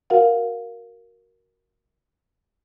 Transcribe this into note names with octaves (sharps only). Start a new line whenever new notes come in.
F#4 A#4 F5 F#5